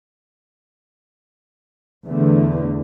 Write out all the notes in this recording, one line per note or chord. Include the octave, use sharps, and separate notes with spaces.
E2 D3 A3